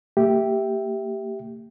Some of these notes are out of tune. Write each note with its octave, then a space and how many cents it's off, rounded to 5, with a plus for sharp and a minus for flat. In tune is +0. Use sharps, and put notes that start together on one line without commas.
A#3 -45 G4 +0 E5 +0